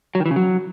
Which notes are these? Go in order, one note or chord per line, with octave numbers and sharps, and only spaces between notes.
F#3
D#3
E3
C#3
F#3